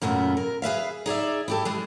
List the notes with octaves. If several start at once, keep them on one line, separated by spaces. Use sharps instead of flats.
F#2 A#2 C#3 A3 B3
A#4
G#4 B4 E5 F5
D#4 G#4 D5 E5
E4 G4 A4
E3 G#3 G#4